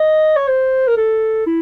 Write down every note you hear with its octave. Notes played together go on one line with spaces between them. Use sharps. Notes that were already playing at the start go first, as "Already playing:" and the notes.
Already playing: D#5
C#5
C5
A#4
A4
E4